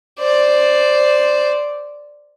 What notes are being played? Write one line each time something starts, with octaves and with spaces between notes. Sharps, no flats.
C5 D5